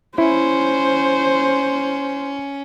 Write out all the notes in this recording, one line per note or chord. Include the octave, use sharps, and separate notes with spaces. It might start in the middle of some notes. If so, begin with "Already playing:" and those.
C#4 E4 C5